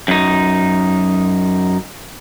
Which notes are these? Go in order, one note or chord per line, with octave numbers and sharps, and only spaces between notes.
F#2 D#4